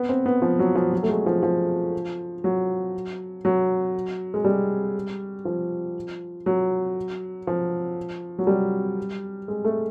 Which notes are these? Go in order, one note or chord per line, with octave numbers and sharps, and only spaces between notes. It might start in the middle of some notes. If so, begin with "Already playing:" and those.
Already playing: B3
C4
B3
F3
F#3
F3
F#3
A3
G#3
F3
F3
F#3
F#3
G#3
G3
F3
F#3
F3
F#3
G3
G#3
A3